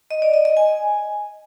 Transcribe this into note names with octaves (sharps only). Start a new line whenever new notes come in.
D#5
D5
D#5
D#5
G#5